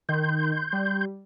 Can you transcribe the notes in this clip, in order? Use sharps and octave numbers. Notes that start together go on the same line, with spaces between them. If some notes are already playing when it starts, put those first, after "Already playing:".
D#3 C6 G6
G3